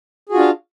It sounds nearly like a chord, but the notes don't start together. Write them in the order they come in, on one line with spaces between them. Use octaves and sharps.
G#4 F#4 F4 D4 F5